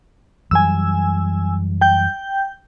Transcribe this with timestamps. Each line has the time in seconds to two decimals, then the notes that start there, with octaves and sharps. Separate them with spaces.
0.51 F#2 E3 G3 G#5 E6
1.81 G5 G6